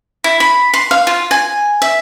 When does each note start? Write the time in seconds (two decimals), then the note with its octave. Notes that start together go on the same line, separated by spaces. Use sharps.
0.24 E4
0.40 B5
0.74 C6
0.91 F5
1.07 F4
1.31 G#5
1.82 E5